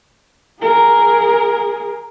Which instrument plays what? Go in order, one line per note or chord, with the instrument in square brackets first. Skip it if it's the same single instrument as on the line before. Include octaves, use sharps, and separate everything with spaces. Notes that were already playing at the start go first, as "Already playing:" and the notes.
[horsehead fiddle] G#4 A#4